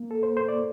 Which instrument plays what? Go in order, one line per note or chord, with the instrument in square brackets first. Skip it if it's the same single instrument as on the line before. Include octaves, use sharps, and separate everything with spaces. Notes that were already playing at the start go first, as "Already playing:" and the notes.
Already playing: [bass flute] A#3
[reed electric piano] A4
C5
C5
D5